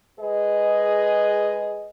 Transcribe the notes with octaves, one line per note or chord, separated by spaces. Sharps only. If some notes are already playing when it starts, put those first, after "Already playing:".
G#3 G#4 B4 D#5